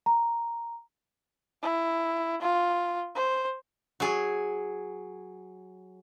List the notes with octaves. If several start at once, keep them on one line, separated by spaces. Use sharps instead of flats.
A#5
E4
F4
C5
F#3 G#4